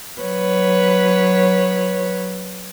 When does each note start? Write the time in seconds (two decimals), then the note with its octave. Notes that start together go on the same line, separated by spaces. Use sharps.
0.20 F#3 B4 C#5